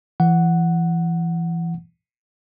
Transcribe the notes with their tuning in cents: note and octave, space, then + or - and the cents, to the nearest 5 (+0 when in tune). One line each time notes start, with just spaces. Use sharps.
E3 +30 F#5 +0